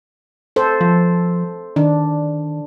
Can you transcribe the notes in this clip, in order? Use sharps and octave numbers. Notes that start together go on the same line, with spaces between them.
A4 C5
F3
D#3 D4